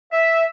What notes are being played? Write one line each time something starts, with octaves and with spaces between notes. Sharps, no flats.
E5